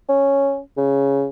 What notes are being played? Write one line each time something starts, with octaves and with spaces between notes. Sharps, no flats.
C#4
C#3